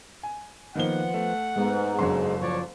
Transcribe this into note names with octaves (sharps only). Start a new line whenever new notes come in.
G#5
D#3 F3 A#3 B3 F#5 G7
A3
G#2 G#3 B3 D#4
F#1 F#3 D4 A4 C6
F3 F4 A4 C#5 D5